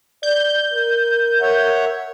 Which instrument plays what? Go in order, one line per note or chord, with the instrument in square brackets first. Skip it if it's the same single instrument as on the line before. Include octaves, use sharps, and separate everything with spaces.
[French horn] D5 [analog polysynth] G6
[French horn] A#4
[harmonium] C#5 E5 F#5